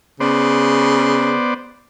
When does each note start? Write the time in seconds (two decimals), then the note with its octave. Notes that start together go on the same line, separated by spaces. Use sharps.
0.20 C#3 B3 C5 D5